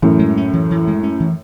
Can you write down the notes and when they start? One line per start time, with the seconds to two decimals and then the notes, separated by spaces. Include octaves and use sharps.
0.02 F#2 A2 E3
0.19 G#3
0.37 C#4
0.53 E3
0.71 E3
0.88 G#3
1.03 C#4
1.20 E3